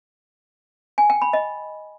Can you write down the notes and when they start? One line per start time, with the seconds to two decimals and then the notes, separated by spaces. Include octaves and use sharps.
0.98 G#5
1.10 G5
1.22 B5
1.33 D#5